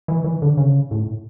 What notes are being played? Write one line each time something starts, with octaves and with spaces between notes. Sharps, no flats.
E3
E3
D3
C#3
A2